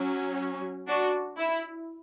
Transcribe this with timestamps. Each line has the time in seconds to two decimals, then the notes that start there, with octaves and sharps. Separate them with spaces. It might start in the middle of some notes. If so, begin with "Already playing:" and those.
Already playing: F#3 C#4
0.88 D4 F#4
1.38 E4